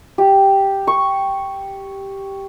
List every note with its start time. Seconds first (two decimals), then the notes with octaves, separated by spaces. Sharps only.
0.18 G4
0.87 C#6